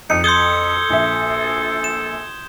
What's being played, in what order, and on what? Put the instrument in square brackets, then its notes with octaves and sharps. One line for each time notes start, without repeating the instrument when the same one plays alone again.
[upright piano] F2 [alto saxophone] D#4 [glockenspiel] C#7
[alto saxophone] A4 [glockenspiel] C6 D#6 [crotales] G6 G#6 G7
[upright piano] A#1 E5
[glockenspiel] E7